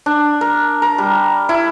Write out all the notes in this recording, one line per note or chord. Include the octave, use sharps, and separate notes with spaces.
D4
A#4
A#4
G3
E4